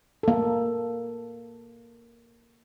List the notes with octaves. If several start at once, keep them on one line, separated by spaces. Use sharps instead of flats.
A#3 A4